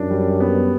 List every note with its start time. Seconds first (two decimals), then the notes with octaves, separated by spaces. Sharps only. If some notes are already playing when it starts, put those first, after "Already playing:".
Already playing: F#2 D4
0.10 G3
0.40 B3